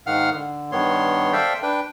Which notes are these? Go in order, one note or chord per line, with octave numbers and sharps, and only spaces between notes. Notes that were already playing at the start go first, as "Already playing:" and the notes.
G#2 D#3 F5 F#5 F6
D3
G2 D#3 B3 C#5 C6
A4 C5 D5 E5 F5 G5
D4 B4 G5